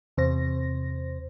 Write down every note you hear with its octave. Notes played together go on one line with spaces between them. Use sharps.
E2 C3 C5 A#6